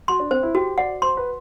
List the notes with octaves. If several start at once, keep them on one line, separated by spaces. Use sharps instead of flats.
F#4 C6
D4
C4 C5
E4
F#4 G4
D5 F#5
C5 C6
B4